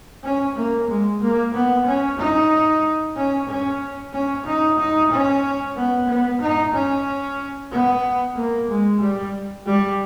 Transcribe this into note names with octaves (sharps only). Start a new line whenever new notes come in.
C#4
A#3
G#3
A#3
B3
C#4
D#4
C#4
C#4
C#4
D#4
D#4
C#4
B3
B3
D#4
C#4
B3
A#3
G#3
G3
G3